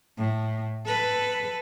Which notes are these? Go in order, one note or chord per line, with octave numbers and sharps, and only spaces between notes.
A2
A4 B4